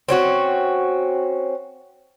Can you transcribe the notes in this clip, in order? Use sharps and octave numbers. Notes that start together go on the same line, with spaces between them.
C4 C#4 F#4